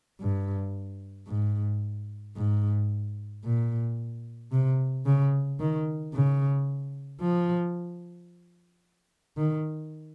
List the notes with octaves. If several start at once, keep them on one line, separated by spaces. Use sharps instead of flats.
G2
G#2
G#2
A#2
C3
C#3
D#3
C#3
F3
D#3